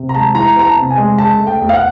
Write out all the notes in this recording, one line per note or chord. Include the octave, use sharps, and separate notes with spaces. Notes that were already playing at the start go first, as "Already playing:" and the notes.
Already playing: C3
A#5
G#3 A5
E3 A#5
B3 A#5
A5
C3
G#5
G#3
C#3 A5
A3
G5
E2
F5
F#5